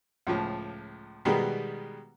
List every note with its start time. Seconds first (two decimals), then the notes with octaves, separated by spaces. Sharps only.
0.27 C#2 A2 F3
1.25 B2 D#3 G3 G#3 B3